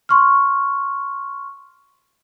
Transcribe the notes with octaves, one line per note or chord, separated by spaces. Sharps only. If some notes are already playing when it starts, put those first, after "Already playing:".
C6 C#6 F6